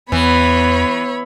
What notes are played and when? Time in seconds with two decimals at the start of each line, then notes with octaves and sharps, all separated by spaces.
0.12 E2 E3 B3 C#5 B5